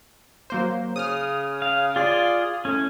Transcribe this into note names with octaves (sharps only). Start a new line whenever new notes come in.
F#3 A#3 C5
C#3 D#6 F6
F5
F4 G#4 D5
A2 C#4